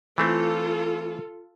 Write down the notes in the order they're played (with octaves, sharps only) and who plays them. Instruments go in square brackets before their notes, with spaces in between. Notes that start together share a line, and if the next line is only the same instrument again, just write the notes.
[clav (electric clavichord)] E3 A3 C4 [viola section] F4 A4